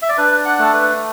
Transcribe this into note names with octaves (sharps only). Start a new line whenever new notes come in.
E5
D5
D4 B4
F#5
A3 A4
B4